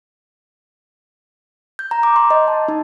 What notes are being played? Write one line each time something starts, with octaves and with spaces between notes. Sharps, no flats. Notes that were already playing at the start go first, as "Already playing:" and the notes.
G6
A#5
D6
C6
D#5
A5
D#4